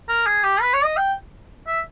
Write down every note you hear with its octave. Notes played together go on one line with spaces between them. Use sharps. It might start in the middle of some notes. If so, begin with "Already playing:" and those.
A#4
G#4
G4
B4
C#5
D#5
G5
E5